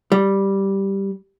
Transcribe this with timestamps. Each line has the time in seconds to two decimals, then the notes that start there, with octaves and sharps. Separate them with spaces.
0.12 G3